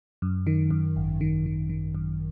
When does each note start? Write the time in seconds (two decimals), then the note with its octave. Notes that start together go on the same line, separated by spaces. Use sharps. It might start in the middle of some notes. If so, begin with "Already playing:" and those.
0.22 F#2
0.47 D#3
0.71 F#2
0.96 G#1
1.21 D#3
1.46 D#3
1.69 D#3
1.95 F#2